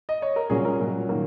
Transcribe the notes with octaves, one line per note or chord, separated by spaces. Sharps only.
D#5
C#5
A#4
A#2 F#3 C#4 G#4
A#4
A#2 F#3 C#4
D#3 F#3 A#3